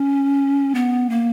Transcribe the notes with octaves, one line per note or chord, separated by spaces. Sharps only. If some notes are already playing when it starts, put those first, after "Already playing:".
Already playing: C#4
B3
A#3